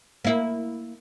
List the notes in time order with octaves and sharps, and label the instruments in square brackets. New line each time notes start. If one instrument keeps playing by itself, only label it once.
[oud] A#3 E4